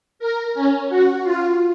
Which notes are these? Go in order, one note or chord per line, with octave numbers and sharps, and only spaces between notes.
A#4
C#4
F#4
F4